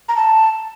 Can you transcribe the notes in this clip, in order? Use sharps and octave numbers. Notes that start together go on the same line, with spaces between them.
A#5
A5